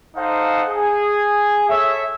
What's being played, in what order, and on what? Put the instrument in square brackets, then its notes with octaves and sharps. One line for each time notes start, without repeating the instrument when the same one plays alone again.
[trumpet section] D#4 A4 C5 F5 F#5
G#4
A4 C#5 E5